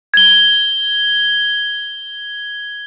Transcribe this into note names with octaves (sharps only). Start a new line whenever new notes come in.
G#6 G7